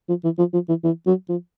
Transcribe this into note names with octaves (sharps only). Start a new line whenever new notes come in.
F3
E3
F3
F3
E3
E3
F#3
F3